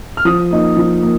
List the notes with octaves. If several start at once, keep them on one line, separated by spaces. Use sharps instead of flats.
F6
F3 D#6
A#3 D#4
F3
A#3